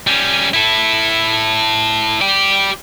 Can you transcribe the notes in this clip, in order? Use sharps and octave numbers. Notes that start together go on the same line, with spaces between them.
G3 C#4
E4 A4
G4 D5